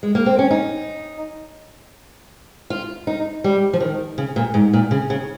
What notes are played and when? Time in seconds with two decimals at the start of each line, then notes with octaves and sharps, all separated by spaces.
0.03 G#3
0.15 A#3
0.26 C4
0.39 C#4
0.51 D#4
2.70 F4
3.07 D#4
3.44 G3
3.73 F3
3.80 D#3
4.18 C#3
4.36 A#2
4.54 G#2
4.73 A#2
4.91 C#3
5.10 C#3